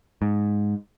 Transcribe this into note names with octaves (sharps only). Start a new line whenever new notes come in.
G#2